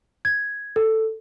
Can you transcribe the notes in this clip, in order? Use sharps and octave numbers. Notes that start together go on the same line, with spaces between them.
G#6
A4